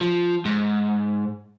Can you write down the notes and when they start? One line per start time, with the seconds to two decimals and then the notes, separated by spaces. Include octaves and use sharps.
0.01 F3
0.45 G#2